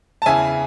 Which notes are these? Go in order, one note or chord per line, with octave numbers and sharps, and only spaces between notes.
A5
E2 C#3 E3 E5 G#5